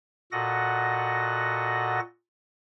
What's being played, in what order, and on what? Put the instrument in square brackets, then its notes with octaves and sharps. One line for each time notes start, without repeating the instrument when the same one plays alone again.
[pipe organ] A#2 F#4 A4 D#5 F#5 A#6